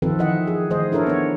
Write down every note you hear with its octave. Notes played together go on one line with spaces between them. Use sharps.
D#3 F3 C4 F4 A4 B4
D#3 E3 E4 D#5 E5 F#5
G#4
D#3 A3 G#4 C5 D#5
D4 E4 A4 A#4 C#5
B3 C#5